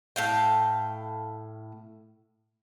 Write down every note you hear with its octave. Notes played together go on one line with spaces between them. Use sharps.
A2 F5 G5